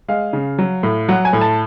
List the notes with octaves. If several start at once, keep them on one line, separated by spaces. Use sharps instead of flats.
G#3 F5
C#3
F#3
A2
F#3 F#5
G#5
A2
A5